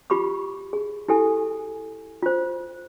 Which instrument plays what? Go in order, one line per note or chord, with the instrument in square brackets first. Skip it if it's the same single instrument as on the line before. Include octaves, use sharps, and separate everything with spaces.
[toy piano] F4 G4 B5 C#6 D6
G#4
E4 G4 A4 G#5
F4 C5